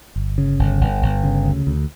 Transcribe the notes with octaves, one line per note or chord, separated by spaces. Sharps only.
G1
C#3
G1
G1
G1
C#3
D2
D2